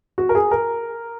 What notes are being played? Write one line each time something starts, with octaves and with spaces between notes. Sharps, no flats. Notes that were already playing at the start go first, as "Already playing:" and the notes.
F#4
A#4
G#4
A#4